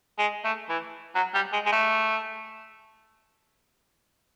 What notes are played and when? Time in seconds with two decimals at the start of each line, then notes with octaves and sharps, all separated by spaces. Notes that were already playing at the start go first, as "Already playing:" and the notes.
0.19 G#3
0.44 A3
0.69 E3
1.15 F#3
1.34 G3
1.53 G#3
1.66 G#3
1.72 A3